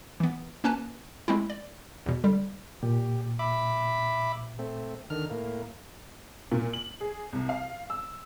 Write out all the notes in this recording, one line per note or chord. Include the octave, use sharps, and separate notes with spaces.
E3 B3
A#3 C#4 B4 G#5 A5
G#3 A3 C4 C#4 E4
D5
E2 B2
D3 G3
A#2 G4
E5 B5 D6
A3 C4
D3 D#3 F6
A2 A#3
A#2
F#7
G#4
C2
F5
E6